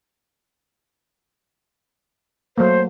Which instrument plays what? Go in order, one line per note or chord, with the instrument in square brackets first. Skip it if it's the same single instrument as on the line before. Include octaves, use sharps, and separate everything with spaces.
[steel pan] F#3 A3 A#3 [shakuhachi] C5